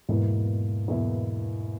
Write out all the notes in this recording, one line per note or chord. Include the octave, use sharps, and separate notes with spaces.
E2 G#2 B2 A#3 E4
E2 B2 A#3 E4